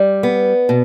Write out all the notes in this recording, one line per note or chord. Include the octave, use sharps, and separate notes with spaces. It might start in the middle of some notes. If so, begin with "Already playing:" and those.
Already playing: G3
B3
B2